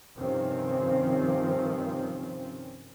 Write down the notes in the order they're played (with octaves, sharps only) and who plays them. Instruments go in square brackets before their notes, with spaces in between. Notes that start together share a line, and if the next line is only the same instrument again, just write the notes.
[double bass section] G2 C3 D#3 F3 C4 C#4